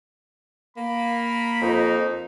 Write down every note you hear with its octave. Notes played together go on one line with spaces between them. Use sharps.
A#3 B5
F2 D#4